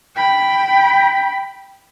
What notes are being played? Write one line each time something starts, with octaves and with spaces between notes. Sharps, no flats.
G5 B5